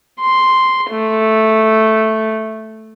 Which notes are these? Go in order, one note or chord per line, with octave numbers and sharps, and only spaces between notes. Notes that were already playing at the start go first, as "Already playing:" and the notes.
C6
A3